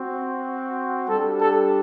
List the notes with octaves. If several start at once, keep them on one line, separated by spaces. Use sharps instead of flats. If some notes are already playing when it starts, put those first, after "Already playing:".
Already playing: C4 F#4
G3 D4 G4 A4
A4